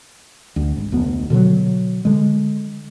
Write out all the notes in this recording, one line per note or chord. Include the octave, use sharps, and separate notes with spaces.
D2
G#1
F1 D2 B3
B2 D3 F3 F#3
D3 G#3